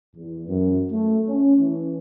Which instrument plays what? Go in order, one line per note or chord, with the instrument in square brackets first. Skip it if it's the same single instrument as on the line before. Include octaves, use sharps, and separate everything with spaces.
[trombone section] E2
F#2
A3
C#4
E3